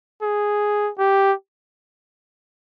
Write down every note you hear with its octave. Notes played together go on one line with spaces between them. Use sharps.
G#4
G4